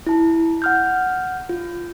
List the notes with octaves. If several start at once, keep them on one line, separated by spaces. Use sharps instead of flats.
E4 A5
F#5 F6 G6
F4